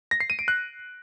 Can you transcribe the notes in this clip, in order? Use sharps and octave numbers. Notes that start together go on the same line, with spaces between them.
A#6
C7
D#7
D7
F#6